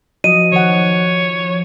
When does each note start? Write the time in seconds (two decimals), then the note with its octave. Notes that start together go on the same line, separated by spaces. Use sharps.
0.24 F3 F#3 F#4 D#5 D#7
0.52 D#3 C#5 F#5